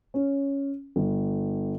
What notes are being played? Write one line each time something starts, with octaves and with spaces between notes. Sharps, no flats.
C#4
G1